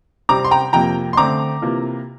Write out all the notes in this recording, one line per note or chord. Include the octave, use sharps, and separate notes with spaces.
C3 G3 C4 A#5 D6
C6
G5 A#5
F2 C3 F3 A#3 G5 A#5
C6
D3 A3 C4 A#5 D6
C3 E3 A#3 F4